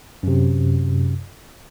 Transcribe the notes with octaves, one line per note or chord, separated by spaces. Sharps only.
F#2 C3